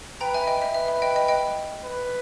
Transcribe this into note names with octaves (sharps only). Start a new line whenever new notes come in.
B4 G5 A#5
E5 G#5
D#5 G5
E5
B4 E5
E5
D#5 G5
D#5 G5
D#5 G5
B4